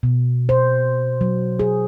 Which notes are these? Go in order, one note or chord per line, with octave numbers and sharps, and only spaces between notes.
B2
C5
F#3
G#4